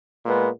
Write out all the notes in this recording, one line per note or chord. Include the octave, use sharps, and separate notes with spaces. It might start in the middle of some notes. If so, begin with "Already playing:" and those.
A#2 G#3 B3